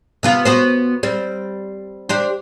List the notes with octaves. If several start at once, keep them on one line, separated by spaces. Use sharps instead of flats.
C3 B3 F4
B3 F#4 C5
G3 C4
D4 G4 C5